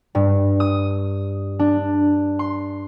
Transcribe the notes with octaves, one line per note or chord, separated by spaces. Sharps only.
G2
D#6
D4
C6